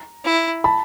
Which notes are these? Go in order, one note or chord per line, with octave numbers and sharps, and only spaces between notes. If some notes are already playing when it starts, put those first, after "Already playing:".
Already playing: A#5
E4
A5 B5